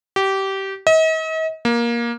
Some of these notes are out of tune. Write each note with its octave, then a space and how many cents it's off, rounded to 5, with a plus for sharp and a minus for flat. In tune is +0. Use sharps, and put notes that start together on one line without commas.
G4 -20
D#5 +45
A#3 +15